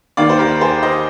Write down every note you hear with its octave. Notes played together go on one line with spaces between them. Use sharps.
D#2 D#3 A#3 D5 F5
C5
G4 A#4
G#4 C5
C5 D#5